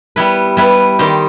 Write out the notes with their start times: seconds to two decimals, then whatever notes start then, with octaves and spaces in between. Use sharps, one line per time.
0.16 G3 B3 E4 B4
0.57 G3 B3 E4 B4
0.99 D#3 G3 D#4 G4 C5